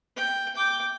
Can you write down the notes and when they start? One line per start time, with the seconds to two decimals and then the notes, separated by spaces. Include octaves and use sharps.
0.17 G5
0.56 G5 D6